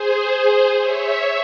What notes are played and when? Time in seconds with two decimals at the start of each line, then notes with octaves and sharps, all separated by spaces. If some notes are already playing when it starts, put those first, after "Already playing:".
Already playing: G#4 C5
0.79 C#5 E5